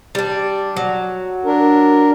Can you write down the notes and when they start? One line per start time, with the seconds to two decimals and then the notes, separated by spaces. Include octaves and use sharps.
0.15 G3 D4
0.77 F#3
1.45 D4 A#4